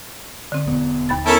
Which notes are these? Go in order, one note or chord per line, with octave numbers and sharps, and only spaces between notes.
D3 C4
E1 B3
D#2 B5 A6
B3 C#4 E4 A4 A#4 A#5